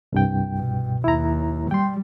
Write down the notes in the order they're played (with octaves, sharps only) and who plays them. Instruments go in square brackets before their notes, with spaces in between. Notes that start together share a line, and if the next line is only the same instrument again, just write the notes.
[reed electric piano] C2 G2 G5
[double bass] B2
[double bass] D#2 [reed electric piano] E4 A#5
[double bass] G3 [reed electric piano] G5 C6